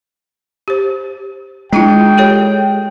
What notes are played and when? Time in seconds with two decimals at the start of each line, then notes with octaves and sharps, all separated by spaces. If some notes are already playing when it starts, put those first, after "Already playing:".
0.68 G4 C5
1.73 G#3 D4 E4 F4 G5
2.17 G4 A4 C#5